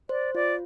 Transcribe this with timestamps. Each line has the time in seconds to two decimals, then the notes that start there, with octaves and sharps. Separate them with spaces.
0.09 C5 D5
0.35 F4 D5